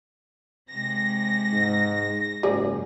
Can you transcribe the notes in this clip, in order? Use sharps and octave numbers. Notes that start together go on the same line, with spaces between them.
C3 G#3 A#6
G#2
F#1 G#2 G4 G#4 D5